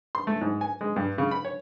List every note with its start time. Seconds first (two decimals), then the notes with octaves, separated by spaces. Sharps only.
0.15 C6
0.27 A3
0.41 G#2
0.61 G#5
0.81 G#3
0.96 G2
1.18 C#3
1.31 B5
1.45 C#5